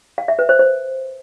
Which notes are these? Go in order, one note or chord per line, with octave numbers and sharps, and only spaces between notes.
F5
E5
B4
C5
C5